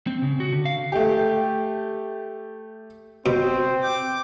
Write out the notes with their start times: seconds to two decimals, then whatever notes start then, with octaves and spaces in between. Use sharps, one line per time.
0.07 C4
0.22 C#3
0.40 F#4
0.52 D3
0.65 F5
0.92 A3 G4
3.26 B2 C4 C5
3.82 G5 D6